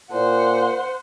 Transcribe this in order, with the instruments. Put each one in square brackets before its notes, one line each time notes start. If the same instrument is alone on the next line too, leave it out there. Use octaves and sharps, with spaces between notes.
[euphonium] A#2 [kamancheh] C5 F#5